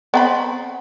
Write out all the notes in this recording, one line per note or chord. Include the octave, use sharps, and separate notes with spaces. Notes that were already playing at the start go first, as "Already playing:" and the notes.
B3 C4 B5